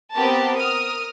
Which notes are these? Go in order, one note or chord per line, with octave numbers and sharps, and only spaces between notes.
B3 C4 G4 A#4 A5
A#4 D#6 F6